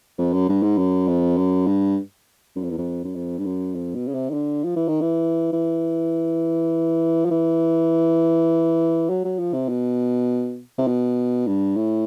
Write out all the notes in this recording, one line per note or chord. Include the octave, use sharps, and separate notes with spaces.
F2
F#2
G2
G#2
F#2
F2
F#2
G2
F#2
F2
E2
F2
F#2
F2
G2
F#2
F2
B2
C#3
C3
D#3
D3
F3
E3
D#3
E3
E3
F3
E3
F#3
F#3
F3
C3
B2
C3
B2
G2
A2